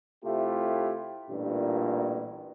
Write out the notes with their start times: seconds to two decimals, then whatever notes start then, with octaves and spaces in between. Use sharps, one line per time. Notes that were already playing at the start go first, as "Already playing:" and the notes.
0.25 C3 A3 E4 F4 G4
1.30 A1 G2 A#2